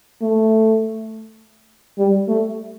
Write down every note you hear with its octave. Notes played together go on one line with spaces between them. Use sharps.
A3
G3
A3